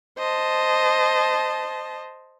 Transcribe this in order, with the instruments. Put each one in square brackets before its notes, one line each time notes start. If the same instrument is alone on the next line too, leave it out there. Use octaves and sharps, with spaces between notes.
[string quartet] C5 D#5 A5